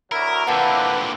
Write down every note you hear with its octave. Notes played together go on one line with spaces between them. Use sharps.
D2 F#3 E4 A#4
A#2 D3 F3 E4 G4 B4 F#5 A5